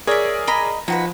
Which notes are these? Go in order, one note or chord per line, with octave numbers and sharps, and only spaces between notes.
G#4 A#4 C#5 D5 E5
D#5 A#5 B5
F3 D#4 F#4 B4